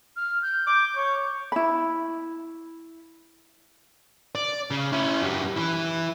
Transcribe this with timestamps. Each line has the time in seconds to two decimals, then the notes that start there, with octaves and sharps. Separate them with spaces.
0.16 F6
0.42 G6
0.67 D6
0.96 C#5
1.52 E4 B5
4.35 D5
4.71 C#3
4.93 C#4 E4
5.22 F#2 G3
5.56 E3 E4